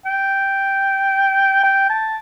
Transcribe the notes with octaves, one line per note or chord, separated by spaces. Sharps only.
G5
G5
A5